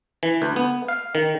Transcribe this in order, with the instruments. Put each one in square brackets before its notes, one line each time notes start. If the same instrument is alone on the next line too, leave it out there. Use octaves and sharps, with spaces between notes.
[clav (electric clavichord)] E3
D2
B3
F5
D#3